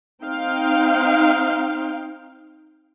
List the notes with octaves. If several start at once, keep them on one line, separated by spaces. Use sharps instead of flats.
C4 D#4 F5 G5